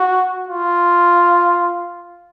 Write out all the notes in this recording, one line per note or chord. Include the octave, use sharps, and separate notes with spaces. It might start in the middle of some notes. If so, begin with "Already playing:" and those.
Already playing: F#4
F4